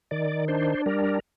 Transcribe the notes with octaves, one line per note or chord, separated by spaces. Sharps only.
D#3 D5
D4 C5
G3 A#4